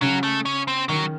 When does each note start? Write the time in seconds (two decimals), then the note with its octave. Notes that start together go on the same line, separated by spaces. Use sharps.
0.02 C#3 F#3
0.23 A3
0.45 C#4
0.68 C4
0.89 D#3 F#3